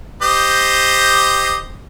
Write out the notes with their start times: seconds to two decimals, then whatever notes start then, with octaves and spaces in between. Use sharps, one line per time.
0.22 G4 C5 D#5